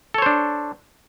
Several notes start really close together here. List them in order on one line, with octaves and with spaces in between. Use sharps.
A4 C#5 C5 D4